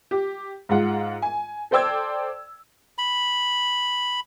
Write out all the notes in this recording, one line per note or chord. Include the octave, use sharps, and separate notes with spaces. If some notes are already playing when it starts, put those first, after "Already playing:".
G4
G#2 G#3 F4 F#5
G#5
A4 C5 D5 G5 E6 G#6
B5